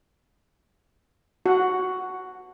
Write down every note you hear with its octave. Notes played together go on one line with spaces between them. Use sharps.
F#4 F#5